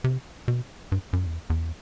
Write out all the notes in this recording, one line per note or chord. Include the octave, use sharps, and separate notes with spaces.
C3
B2
G2
F#2
E2
E2